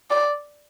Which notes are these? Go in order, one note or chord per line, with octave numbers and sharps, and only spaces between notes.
D5